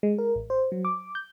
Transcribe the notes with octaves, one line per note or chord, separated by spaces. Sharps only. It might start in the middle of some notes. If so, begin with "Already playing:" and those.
G#3
A#4
A1
C5
F#3
D6
G6